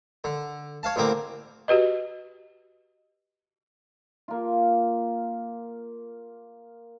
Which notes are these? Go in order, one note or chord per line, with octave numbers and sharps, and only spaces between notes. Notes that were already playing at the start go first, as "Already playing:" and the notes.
D3
C#5 F5 A5
A1 D3 A#3 C4 A#5 D6
F#4 G4 B4 D#5
A#3 F4